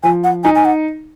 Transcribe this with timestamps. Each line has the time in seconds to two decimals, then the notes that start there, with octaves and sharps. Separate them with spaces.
0.03 F3 G#5
0.24 F#5
0.44 D#4 G#5
0.55 G#5
0.65 F#5